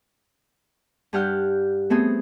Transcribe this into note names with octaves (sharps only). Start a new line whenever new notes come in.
G2 G4 F#5 F6 G6
A3 B3 C4 G#4